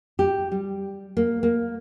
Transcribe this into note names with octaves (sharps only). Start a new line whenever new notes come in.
G4
G3
A#3
A#3